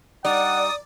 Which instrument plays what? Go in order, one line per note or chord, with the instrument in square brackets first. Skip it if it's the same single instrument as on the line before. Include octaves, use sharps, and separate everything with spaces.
[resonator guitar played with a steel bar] G3 D#4 [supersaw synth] D5 [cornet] F#5 [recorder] D#6